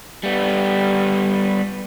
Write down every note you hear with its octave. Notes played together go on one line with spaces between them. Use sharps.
G3 B3